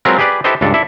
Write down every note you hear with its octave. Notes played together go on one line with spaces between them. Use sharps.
F#3 G#3 C4 F4 A#4 B4
G4 G#4 B4 D5
E4 G4 A4 B4 C5 D#5
C#2 G2 D4 A4
E4 A4 D5 E5